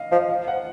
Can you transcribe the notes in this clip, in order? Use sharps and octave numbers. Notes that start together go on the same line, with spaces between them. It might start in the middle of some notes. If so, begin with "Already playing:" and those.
Already playing: D#5 F5
F3 D#5
F5
F#5